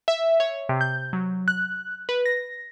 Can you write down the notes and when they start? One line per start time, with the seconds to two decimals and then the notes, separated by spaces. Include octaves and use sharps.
0.08 E5
0.40 C#5
0.69 C3
0.81 G6
1.13 F#3
1.48 F#6
2.09 B4
2.26 A#6